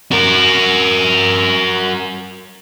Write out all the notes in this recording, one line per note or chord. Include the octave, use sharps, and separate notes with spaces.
F#4 A#4